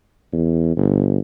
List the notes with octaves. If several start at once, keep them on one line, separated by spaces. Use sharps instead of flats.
E2
G1